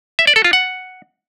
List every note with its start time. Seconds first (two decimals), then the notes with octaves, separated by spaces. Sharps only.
0.19 E5
0.27 D5
0.36 A4
0.44 F4
0.53 F#5